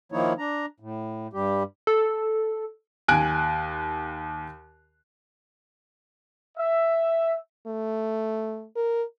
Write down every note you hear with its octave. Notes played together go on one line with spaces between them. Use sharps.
D#3 F3 A#3 D#4 E4 C#5
D4 A#5
A2
G2 G3 G4
A4
D#2 G#5 F#6 D7
E5
A3
A#4